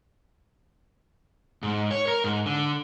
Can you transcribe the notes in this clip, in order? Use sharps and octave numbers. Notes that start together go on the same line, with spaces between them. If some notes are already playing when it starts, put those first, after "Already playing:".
G#2
C#5
A#4
G#2
D3